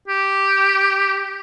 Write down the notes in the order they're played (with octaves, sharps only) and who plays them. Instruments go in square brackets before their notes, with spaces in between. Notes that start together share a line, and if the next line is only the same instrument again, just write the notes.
[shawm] G4